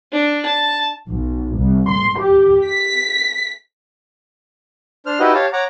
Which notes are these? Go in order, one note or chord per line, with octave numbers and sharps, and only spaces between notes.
D4
A5
B1
C2
C6
G4
B6
D4 C5 F6
D#4 E4 F#4 G4 B4 D#5
G4 C#5 F5 A5
C#5 F#5 A#5 D6